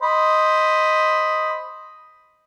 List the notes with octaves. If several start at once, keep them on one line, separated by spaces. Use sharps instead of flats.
C5 D#5 B5